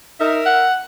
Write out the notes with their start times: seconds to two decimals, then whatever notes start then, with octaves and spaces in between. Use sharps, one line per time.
0.20 D#4 A#4 E5
0.46 F#5